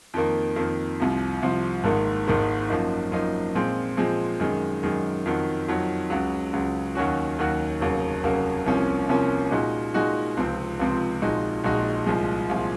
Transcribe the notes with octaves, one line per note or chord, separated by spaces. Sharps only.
F2 D#3 A#3
F2 D#3 A#3
C2 C3 F3
C2 C3 F3
G#1 G#2 D#3 A#3
G#1 G#2 D#3 A#3
F#2 F3 A#3 D#4
F#2 F3 A#3 D#4
A#2 F3 G#3 C4
A#2 F3 G#3 C4
F#2 D#3 G#3
F#2 D#3 G#3
F2 D#3 F#3
F2 D#3 F#3
C#2 C#3 F#3
C#2 C#3 F#3
D#2 D#3 F#3 C#4 F#4
D#2 D#3 F#3 C#4 F#4
F1 D#2 C#3 F#3 A#3
F1 D#2 C#3 F#3 A#3
C2 C3 F3 A#3 C#4
C2 C3 F3 A#3 C#4
A#2 G#3 D#4 F#4
A#2 G#3 D#4 F#4
C#2 C3 F3 C4
C#2 C3 F3 C4
A#1 A#2 G#3 D#4 F#4
A#1 A#2 G#3 D#4 F#4
C2 A#2 F3 G#3
C2 A#2 F3 G#3